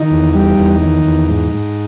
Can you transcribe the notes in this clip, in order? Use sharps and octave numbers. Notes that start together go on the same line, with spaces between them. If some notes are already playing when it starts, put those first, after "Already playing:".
Already playing: D#3 D#4
E2
G3
E2
D#3
E2
G#2
G#2